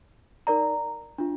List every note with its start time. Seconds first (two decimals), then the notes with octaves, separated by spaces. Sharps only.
0.47 D#4 A#4 D5 A#5
1.18 D4 F4